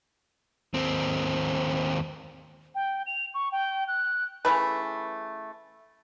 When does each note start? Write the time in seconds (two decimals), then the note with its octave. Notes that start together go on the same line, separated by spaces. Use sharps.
0.74 D#2 C4
2.75 G5
3.06 F7
3.34 C#6
3.52 G5
3.88 F#6
4.45 C#3 E3 A3 B4